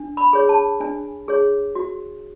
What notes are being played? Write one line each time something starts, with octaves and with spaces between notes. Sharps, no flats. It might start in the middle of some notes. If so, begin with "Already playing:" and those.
Already playing: D4
B5
G#4 C#5
A5
D4 G#5
G#4 C#5
F#4